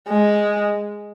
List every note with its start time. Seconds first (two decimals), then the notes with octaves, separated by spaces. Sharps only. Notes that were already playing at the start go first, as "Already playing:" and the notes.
0.08 G#3